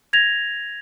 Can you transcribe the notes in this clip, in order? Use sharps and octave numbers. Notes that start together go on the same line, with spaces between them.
G#6 A#6 F7